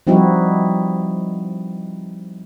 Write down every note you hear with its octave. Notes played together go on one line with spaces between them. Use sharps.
F3 G3 C4 D#4 E4 F#4